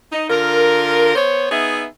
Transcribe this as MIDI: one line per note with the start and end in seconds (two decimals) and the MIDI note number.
0.12 0.26 63
0.30 1.13 50
0.30 1.13 65
0.30 1.13 70
1.16 1.50 59
1.16 1.50 72
1.16 1.50 73
1.51 1.86 59
1.51 1.86 63
1.51 1.86 68
1.51 1.86 76